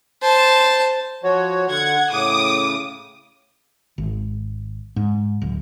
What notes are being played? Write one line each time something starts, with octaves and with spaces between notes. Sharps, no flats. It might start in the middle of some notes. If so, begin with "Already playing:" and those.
C5 A5
F3 F#4 C#5
D3 F#5 G#6
A2 C#3 D6 D#6
G#1
G#2
D1